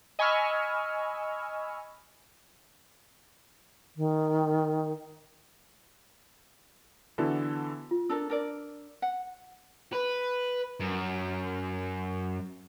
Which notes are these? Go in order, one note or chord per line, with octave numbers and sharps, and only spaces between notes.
D#5 G#5 B5 C#6 E6 F6
D#3
D3 E3 B3 E4 F#4 A4
F4
D4 A4 A#4 E6
D4 A#4 D5
F#5
B4
F#2